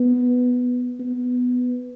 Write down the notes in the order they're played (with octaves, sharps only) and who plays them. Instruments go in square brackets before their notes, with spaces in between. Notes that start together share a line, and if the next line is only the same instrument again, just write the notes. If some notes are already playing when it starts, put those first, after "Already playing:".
Already playing: [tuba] B3
B3